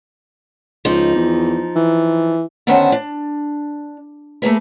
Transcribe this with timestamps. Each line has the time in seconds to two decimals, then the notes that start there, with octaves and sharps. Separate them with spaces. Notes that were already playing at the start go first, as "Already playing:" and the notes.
0.85 C#2 F3 D#4
1.16 E2
1.76 E3
2.67 D3 D#3 B3 C#4 C5 A5
2.92 D4
4.42 A3 A#3 G#4 B4